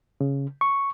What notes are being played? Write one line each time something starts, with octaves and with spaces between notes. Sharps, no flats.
C#3
C#6